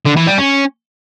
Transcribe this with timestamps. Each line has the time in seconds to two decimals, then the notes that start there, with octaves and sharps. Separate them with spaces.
0.05 D3
0.16 E3
0.27 G3
0.38 C#4